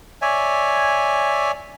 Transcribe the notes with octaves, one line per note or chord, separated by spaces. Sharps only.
C#5 D5 E5 G#5